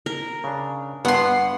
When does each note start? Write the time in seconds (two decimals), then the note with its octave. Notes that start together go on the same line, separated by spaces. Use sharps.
0.06 A#4
0.44 C#3 D4
1.05 G2 B3 F#5 C6